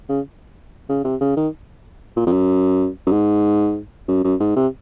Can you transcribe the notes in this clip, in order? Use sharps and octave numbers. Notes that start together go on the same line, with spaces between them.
C#3
C#3
C3
C#3
D#3
A#2
F2
F#2
F#2
G#2
F#2
F#2
G#2
C3